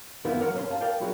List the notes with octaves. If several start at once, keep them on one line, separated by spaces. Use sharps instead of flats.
F#2 D#3 A#3 B3 E4 F4
D3 E3 F#3 A#4 F#5
B1 G2 C#4 A#4 G#5 C6
C3 F5 G#5 A5
A#4 D5 F5 G5
F#3 E4 F#4 G#4